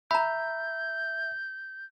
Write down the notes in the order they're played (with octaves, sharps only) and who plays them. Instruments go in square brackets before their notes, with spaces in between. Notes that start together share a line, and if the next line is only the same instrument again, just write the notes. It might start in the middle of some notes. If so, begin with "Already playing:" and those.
[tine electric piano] E5 [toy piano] A#5 B5 [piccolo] G6